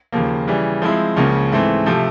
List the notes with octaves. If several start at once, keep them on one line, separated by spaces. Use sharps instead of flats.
D#2 C#3 F3 A#3
C#3 E3 G3
F3 G#3 C4 E4
C#2 C#3 F3 A#3 C#4
G#2 E3 A3 C4
C3 F3 A3